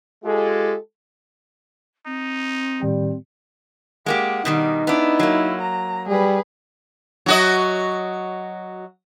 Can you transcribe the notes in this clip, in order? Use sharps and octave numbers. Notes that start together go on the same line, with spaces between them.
G#3 F4 G4 A4
C4 D#4
A2 D#3 G3 G5
G#3 A#3 G4 F#5
B2 D#3 G3 D#4
B3 D4 E4
F#3 A#3
A#5
G3 G#4 B4
F#3 F#4 D#5